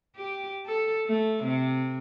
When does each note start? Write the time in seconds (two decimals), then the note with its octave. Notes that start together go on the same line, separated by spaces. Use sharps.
0.16 G4
0.66 A4
1.06 A3
1.44 C3